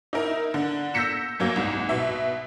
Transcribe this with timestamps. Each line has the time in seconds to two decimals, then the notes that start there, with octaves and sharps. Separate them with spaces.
0.13 D#4 E4 A#4
0.54 D3
0.94 E6 G6 A#6 B6 C#7 E7
1.40 F#2 F#3 A#3
1.56 C2 G#2
1.89 B2 E5